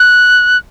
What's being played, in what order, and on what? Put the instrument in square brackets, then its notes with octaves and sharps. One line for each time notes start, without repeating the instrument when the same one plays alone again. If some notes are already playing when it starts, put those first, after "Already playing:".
Already playing: [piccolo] F#6